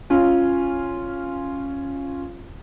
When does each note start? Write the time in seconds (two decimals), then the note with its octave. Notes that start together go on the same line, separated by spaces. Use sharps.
0.10 C#4 F4